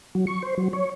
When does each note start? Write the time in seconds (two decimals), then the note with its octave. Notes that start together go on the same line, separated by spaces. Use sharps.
0.15 F#3
0.27 C#6
0.43 C5
0.57 F#3
0.73 C#5